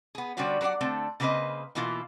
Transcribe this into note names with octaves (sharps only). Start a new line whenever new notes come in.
B3 G#4
D3 G3 C#4 F#4 G4 C5
F#3 A#4 C#5 D5 F#5
D3 A3 C4 A4
C#3 A#3 C4 B4 C5 D#5
B2 E3 A#3 E4 F4